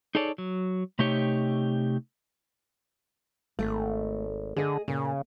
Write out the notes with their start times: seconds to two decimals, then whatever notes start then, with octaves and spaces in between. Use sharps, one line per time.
0.15 D#4 G#4 A4 C#5 D5
0.38 F#3
0.99 C3 A3 D#4 G4 C#5
3.59 G#1 A3
4.56 D3 G#4 D#5
4.88 A#2 C#3